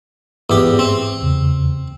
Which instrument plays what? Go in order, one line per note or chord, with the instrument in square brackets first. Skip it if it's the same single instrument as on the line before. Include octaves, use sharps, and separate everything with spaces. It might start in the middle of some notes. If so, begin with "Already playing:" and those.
[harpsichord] E2 G4 [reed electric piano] G#2
[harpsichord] C4
[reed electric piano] E2 C#3